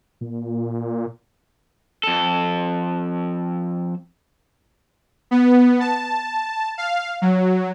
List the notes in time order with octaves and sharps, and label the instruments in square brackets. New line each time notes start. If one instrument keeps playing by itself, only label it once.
[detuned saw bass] A#2
[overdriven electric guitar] F2 A4
[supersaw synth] B3
A5
F5
F#3